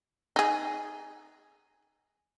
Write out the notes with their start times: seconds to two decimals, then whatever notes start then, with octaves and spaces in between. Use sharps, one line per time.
0.36 D#4 G#4